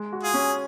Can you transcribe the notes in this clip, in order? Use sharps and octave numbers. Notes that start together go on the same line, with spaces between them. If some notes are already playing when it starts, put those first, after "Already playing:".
Already playing: G#3
F#4
F4 G#4
C#4